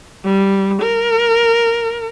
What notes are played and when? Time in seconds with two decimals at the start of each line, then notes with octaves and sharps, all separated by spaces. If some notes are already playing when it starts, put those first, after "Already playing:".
0.25 G3
0.82 A#4